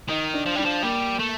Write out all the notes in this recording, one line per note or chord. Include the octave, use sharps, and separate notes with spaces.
D#3 D#4
D4
F3
G3 D4
F3
G3 A#3
A3